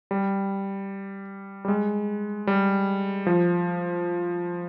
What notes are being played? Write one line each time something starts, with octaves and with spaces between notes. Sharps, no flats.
G3
G3
G#3
G3
F3